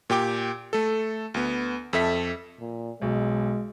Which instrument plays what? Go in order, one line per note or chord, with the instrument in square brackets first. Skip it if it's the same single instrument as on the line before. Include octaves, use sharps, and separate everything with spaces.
[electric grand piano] A#2 G4 G5 D6
A3 A4
D2 B3
F2 A4 E5 B6
[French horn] A#2
[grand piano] B1 [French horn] G#3